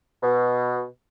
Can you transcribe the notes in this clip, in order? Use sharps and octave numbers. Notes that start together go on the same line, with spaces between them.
B2